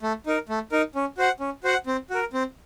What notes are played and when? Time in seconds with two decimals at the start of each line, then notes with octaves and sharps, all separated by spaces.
0.03 A3
0.26 D#4 A#4
0.49 A3
0.72 D#4 A#4
0.95 C#4
1.18 F#4 C5 F#5
1.40 C#4
1.64 F#4 C5 F#5
1.87 C4
2.10 F#4 A#4
2.33 C4